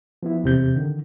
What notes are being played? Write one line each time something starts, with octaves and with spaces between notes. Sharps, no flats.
F3 B3 E4
E2 C3 G6
D3 D#3